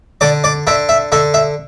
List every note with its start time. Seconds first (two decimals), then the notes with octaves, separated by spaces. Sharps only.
0.21 D3 D5
0.44 D5
0.67 D3 E5
0.89 E5
1.12 D3 E5
1.34 E5